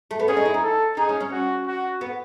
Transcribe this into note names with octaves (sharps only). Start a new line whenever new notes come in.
A3
B3
C#4 G#4
D#4
E4
D#4
A4
D#4 G#4
C#4
C#4
F#4
F#4
B3